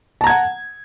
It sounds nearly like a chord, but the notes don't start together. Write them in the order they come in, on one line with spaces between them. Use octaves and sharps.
A5 A#5 G#6 F#5